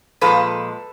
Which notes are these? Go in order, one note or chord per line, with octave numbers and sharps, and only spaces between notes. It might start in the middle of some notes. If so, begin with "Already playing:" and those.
A#2 F3 G#3 A4 B4